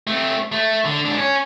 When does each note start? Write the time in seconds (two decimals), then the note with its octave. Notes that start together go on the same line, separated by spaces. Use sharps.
0.07 A3 C4
0.52 A3
0.85 D3
1.05 G#2 D4
1.18 C#4